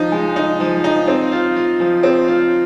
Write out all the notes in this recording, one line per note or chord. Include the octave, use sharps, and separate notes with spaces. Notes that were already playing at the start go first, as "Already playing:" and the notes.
Already playing: F3 D#4
G#3
D#4
F3
D#4
C4
F4
F4
F3
C4
F4